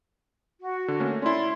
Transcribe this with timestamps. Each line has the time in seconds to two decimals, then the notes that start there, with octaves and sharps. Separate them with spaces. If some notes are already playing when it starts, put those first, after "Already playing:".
0.60 F#4
0.88 D3
1.00 A3 A#3 C#4
1.22 C#4 E4 D5 C6